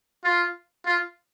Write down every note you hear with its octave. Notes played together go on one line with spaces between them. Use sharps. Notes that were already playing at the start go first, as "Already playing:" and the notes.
F4
F4